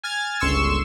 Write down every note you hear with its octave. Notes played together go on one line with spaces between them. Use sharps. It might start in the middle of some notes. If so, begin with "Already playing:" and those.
G#5 F6 G#6 A6
G1 C#2 C6 C#6 E6 E7